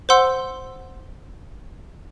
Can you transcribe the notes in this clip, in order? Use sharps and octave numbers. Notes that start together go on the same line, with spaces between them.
C5 F#5 C6 E6